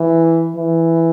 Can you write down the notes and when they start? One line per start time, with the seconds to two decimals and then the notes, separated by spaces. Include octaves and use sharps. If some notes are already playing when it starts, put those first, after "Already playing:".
Already playing: E3
0.56 E3